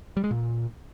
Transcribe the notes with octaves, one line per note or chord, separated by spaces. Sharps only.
G3
G#3
A#2